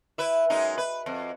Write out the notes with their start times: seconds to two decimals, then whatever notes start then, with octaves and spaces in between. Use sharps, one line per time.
0.18 E4 B4 E5
0.50 F#2 G#3 D#4
0.78 B4
1.06 F2